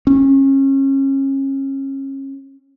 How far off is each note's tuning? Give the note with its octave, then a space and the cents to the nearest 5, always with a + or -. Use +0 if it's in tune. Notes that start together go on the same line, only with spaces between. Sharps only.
C#4 -30